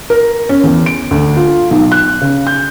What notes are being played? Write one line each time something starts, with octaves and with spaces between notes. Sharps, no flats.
A#4
C#4
E2
D7
D2
F4
B1
F#6
C#3
G6